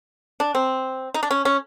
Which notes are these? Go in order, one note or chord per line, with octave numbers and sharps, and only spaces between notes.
D4
C4
D#4
D4
C#4
C#4